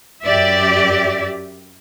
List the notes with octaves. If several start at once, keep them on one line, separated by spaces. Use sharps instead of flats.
F#2 G4 D5 E5